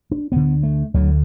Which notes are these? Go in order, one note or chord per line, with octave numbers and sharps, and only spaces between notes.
D4
D2 D3 B3
A3
D2 D3 F#3